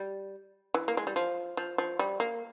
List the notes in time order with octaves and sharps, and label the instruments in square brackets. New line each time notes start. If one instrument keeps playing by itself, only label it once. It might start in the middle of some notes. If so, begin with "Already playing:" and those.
Already playing: [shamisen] G3
E3
A#3
G#3
G3
F3
F3
F3
G3
A#3